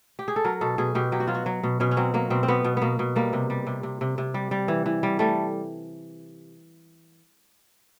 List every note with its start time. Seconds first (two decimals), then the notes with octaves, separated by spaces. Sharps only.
0.19 G4
0.28 G#4
0.36 A4
0.44 F#3 A#4
0.61 B2 A4
0.78 B2 G#4
0.95 B2 G4
1.12 F#3 G4
1.20 F#4
1.27 F#3 F4
1.34 F#4
1.46 F#3
1.63 B2
1.80 B2 C#4
1.91 C#4
1.97 F#3 C4
2.14 F#3 A#3
2.30 B2 C4
2.43 C4
2.48 B2 B3
2.64 B2
2.77 B2 A#3 B3
2.99 B2
3.16 G3 A#3
3.33 C3
3.50 G3
3.67 C3
3.83 C3
4.01 C3
4.18 C3
4.34 G3
4.51 G3
4.68 E3
4.86 E3
5.03 G3
5.19 G3 A3